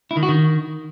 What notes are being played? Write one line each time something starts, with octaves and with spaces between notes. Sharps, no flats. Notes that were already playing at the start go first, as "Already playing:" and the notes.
E4
D#3
F#4
D#3